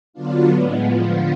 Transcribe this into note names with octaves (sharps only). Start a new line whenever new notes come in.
D3 F#3 B3 D4 F4
A2 G#3 B3
D3 F3 B3 F4